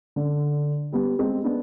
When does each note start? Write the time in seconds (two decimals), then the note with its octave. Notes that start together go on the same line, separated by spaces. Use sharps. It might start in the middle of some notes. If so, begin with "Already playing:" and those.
0.16 D3
0.92 G3 B3
1.19 G#3 C4
1.44 B3 D4